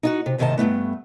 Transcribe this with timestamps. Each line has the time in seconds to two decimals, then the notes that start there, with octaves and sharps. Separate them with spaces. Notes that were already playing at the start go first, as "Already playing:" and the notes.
0.03 D#4 F4 F#4
0.26 C3
0.38 D#2 G#2 C3 D#3 D#5 A5
0.58 G2 C3 A3 B3